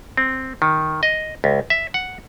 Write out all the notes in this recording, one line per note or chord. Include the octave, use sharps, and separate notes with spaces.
C4
D#3
D#5
C#2
E5
F#5